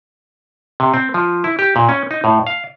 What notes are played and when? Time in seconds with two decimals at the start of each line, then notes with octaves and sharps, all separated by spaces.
0.80 C3
0.94 C4
1.14 F3
1.44 E4
1.59 G4
1.76 A#2
1.89 C#4
2.11 D#4
2.24 A2
2.47 F5